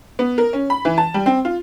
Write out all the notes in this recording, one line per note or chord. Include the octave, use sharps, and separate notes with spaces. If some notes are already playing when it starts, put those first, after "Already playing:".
B3
A#4
C#4
B5
E3
A5
G3
C4
F4